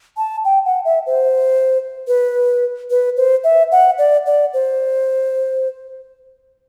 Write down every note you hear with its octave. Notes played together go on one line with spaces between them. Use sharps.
A5
G5
F#5
E5
C5
B4
B4
C5
E5
F#5
D5
D5
C5